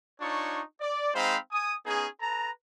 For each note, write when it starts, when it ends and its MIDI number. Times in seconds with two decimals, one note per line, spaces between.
0.21 0.62 62
0.21 0.62 63
0.21 0.62 65
0.21 0.62 73
0.21 0.62 85
0.81 1.10 74
1.15 1.37 56
1.15 1.37 60
1.15 1.37 63
1.15 1.37 72
1.15 1.37 77
1.15 1.37 83
1.52 1.74 80
1.52 1.74 87
1.86 2.07 59
1.86 2.07 61
1.86 2.07 63
1.86 2.07 68
2.21 2.50 69
2.21 2.50 71
2.21 2.50 81
2.21 2.50 82